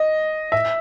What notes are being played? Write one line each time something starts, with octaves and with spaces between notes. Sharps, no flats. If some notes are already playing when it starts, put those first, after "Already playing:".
Already playing: D#5
E5